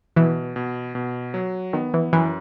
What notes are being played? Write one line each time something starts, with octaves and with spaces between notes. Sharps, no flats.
B2 E3
B2
B2
F#3
D#3 B3
E3
F#2 E3